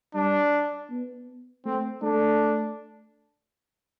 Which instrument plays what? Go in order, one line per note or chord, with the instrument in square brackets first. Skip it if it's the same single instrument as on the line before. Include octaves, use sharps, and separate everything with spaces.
[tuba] G3 [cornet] D4
[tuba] B3
[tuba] A3 [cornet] C4
[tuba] A3 [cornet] D4